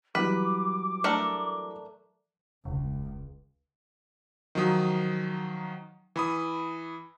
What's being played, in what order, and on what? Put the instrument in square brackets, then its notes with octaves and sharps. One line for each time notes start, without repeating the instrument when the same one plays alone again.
[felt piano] E3 F#3 G3 [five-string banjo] B4 [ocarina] D6
[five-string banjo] A3 D4 A#4
[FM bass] E1 [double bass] C#2
[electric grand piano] D#3 F3 F#3 D#6
E3 B5 D#6